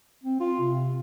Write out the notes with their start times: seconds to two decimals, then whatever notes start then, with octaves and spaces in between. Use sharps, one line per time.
0.24 C4
0.40 F4
0.61 C3